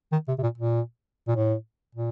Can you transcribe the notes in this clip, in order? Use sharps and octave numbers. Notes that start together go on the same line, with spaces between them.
D#3
C3
C3
A#2
A#2
A#2
A2
A#2